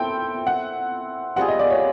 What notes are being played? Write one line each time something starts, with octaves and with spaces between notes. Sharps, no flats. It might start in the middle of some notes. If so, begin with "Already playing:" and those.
Already playing: C4 E4 A4 G5
F#5
G3 C4 F4 G#4 F#5
D#5
D5
C#5